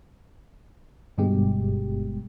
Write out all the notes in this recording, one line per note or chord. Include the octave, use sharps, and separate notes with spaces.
G1 G2 B2 G#3 G4